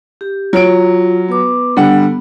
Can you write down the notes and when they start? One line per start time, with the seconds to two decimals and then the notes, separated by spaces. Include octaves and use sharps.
0.21 G4
0.53 F#3 F4 D7
1.29 B3 B4 D6
1.77 D3 G3 B3 F#5